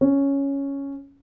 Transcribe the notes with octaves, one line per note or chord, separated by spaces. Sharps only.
C#4